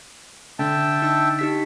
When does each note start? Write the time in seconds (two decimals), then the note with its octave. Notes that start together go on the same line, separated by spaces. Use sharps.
0.59 D3 E5 G5 A5
1.02 D#4 E6
1.39 D#4 G4 B6